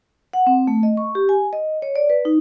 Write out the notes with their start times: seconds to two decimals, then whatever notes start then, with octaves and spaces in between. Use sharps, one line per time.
0.33 F#5
0.47 C4
0.67 A3
0.83 D#5
0.97 C#6
1.15 G4
1.29 G#5
1.53 D#5
1.82 C#5
1.96 D5
2.10 B4
2.25 D#4